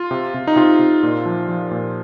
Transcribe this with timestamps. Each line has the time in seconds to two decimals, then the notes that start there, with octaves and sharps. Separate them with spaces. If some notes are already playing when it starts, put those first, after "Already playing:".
Already playing: F4
0.11 C3
0.34 C3
0.47 D#4
0.56 C3 F4
0.79 C3
1.03 A#2
1.26 F3
1.48 F3
1.71 A#2